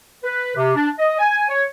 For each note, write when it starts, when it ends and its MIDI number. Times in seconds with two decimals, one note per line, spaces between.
0.23 0.51 71
0.56 0.74 48
0.75 0.89 62
0.97 1.18 75
1.19 1.44 80
1.49 1.64 73